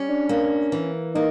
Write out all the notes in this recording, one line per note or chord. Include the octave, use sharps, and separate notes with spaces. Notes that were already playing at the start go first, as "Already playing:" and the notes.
Already playing: G3 C#4
D4
A#3
E3
A#3 D#4